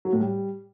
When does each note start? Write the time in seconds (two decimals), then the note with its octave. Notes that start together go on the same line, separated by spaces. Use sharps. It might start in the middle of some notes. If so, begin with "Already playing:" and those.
0.05 F#3
0.13 A2
0.21 G3